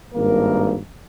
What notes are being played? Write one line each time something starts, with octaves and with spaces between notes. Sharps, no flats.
G#1 G2 A#3 A#4